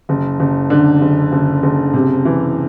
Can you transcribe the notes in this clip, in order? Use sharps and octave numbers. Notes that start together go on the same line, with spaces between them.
F#1
F#1
D3
F#1
F#1
F#1
C3
E3